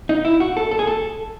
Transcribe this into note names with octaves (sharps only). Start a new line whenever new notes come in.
D#4
E4
F#4
A4
A4
G#4
A4